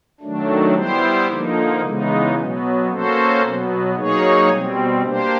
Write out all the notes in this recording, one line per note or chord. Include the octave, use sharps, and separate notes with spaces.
D#3 F#3 A3 D4
G3 B3 E4 G4 C5
D3 F3 A#3 D#4
C#3 E3 G#3 B3 D#4
B2 F#3 B3
A#3 C#4 F#4 A4 C5
B2 F#3 B3
F#3 A#3 D#4 G#4 C#5
B2 G3 C4
A#3 D4 G4 C5